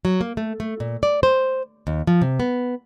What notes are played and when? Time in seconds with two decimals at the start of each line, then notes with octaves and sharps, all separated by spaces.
0.05 F#3
0.21 A#3
0.37 A3
0.60 A3
0.80 A#2
1.03 D5
1.23 C5
1.87 D#2
2.07 F3
2.22 C3
2.40 B3